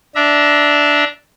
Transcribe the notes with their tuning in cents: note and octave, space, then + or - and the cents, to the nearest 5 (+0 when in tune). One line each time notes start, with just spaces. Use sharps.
D4 -5 E5 +0 A#5 +35